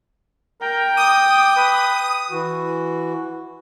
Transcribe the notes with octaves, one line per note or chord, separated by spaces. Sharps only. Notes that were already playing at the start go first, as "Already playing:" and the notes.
A#4 G5
D6 D#6
B4
E3 F#4